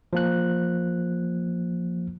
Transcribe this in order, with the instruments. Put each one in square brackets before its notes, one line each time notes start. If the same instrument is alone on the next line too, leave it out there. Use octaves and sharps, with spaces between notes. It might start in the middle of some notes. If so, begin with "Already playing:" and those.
[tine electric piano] F3 A#3 F#6